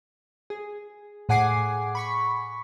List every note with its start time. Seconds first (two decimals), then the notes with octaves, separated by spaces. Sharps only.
0.50 G#4
1.29 A2 G#4 F#5 G#5 D6 C7
1.95 B5 C#6 B6